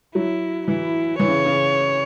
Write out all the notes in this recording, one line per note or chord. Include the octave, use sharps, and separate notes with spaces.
F#3 E4
E3 E4
E3 C#5
C#3
C#3